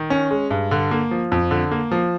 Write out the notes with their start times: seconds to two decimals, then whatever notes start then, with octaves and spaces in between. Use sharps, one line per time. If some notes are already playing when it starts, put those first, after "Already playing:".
Already playing: D#3
0.10 C#4
0.31 G#3
0.51 G2
0.71 D3
0.91 A#3
1.11 F3
1.32 F2
1.51 D3
1.71 A#3
1.91 F3